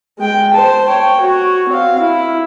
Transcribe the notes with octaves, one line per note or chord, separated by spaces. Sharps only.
G#3 G5
C5 A5
C#5 G5
F#4 C#5
C4 F5
E4